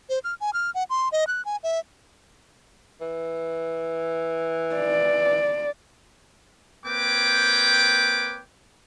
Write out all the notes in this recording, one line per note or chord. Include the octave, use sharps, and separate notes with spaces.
C5
F6
G#5
F6
F#5
C6
D#5
F#6
G#5
E5
E3
D5
A#3 C4 B4 C#5 G5 D6